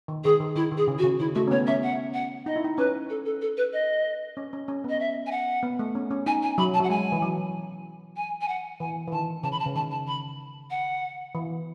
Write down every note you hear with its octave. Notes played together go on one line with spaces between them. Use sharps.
D#3
D#3 G#4
D#3
D#3 E4
D#3
G#4
C#3
F#4
C#3
D#3 E4
A3 F#4
C#4
B3 C#5
C#4 E5
F#5
F#5
D#4 D#5
E4
D#4
C#4 B4
A4
A4
A4
B4
D#5
C#4
C#4
C#4
B3 D#5
E5
G#5
F#5
B3
A3
C#4
C#4
D#4 G#5
G#5
F#3 B5
A5
F#3 F#5
G#3 G#5
E3
F#3
G#5
G#5
F#5
E3 G#5
E3
D#3 A5
C#3 A5
B5
A5
C#3
D#3 A5
A5
B5
F#5
E3